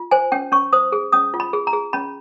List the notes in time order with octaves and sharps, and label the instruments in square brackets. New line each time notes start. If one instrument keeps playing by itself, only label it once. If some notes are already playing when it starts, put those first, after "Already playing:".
Already playing: [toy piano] F4
C5 G#5
C#4 G5
C#4 C#6
C5 D#6
G#4
C#4 D#6
F4
B5
G#4
A#5
G#4
C#4 B5